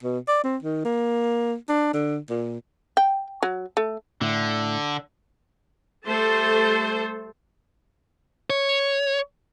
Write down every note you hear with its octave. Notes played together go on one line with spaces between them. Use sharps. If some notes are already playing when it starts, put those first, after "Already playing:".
B2
D5
C4
D#3
A#3
D4
D3
A#2
G5
F#3
A3
A2 D3
G3 A3 A4 C5 A5
C#5